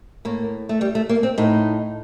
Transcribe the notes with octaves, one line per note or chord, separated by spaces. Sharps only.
A2 A#3
A3
G3
A3
A#3
C4
A2 D#4